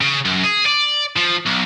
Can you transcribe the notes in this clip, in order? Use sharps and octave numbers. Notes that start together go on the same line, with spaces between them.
C#3
F#2
G#4
D5
F3
B1